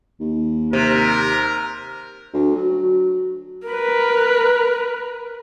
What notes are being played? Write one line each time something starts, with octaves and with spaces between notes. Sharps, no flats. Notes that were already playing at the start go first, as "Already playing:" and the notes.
D#2
C3 A#4
D2
F#3
A#4 B4